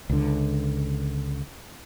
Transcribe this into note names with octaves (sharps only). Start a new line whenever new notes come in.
C#2 D3